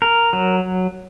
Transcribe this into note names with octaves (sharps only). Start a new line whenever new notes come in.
A#4
F#3